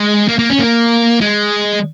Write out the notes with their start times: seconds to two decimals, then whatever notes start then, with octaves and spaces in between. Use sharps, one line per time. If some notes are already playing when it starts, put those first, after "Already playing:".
Already playing: G#3
0.28 A#3
0.39 A#3
0.50 C#4
0.59 A#3
1.21 G#3